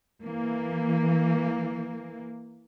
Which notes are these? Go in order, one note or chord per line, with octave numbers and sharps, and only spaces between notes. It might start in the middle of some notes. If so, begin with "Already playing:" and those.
E3 A#3